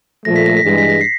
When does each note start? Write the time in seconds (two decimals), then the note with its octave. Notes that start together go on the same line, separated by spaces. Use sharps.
0.25 A#2 F3 A3 A#6
0.36 B6
0.46 A#6
0.57 B6
0.63 G2 E3 G#3
0.69 A#6
0.78 B6
0.90 A#6
1.01 C7